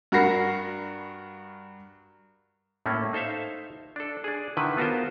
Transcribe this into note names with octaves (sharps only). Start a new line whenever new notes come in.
G2 F#4 A#4 B5 A#6 C7
A2 A3 A#3 C#4
D#4 A4 C5 E5 F5
D4 A4
D4 G#4
D3 D#3 E4 B4
B3 F4 F#4 A#4 C5